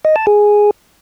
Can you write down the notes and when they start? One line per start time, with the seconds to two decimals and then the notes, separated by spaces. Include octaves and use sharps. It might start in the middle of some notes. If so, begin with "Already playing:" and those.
0.05 D#5
0.16 A5
0.27 G#4